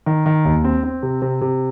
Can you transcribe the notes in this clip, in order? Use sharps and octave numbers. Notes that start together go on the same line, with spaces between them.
D#3
D#3
D#2
C4
C4
C3
C3
C3